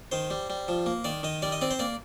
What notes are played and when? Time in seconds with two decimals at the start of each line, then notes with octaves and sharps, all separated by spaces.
0.12 D#3 C5
0.30 G3
0.50 G3
0.68 F3
0.86 A#3
1.04 D#3 D5
1.23 D#3 D#5
1.42 G3 D5
1.52 D#5
1.61 C4 D5
1.71 C5
1.79 A#3 D5